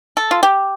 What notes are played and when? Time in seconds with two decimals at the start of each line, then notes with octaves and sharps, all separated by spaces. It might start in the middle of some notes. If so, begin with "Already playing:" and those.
0.17 A4
0.31 F4
0.43 G4